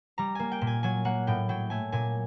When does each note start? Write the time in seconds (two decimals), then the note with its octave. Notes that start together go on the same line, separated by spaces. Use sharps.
0.18 G3 A#5
0.35 A#3 G#5
0.52 G5
0.61 A#2
0.67 G#5
0.83 F#3 G#5
1.05 A#3 F#5
1.27 A2 G5
1.49 F#3 G5
1.70 A3 G#5
1.92 A#2 G#5